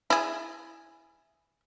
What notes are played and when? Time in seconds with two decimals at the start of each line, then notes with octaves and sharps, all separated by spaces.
0.10 E4 G#4